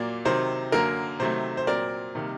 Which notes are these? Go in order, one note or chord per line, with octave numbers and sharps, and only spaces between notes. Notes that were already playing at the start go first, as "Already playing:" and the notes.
Already playing: A#2 F#3 A#3 D5
C3 D#3 F#3 C5
F#2 D3 F#3 A#3 A#4
C3 D#3 F#3 A3 C5
C5
A#2 F#3 C4 A#4 D5
C3 D#3 G3 A#3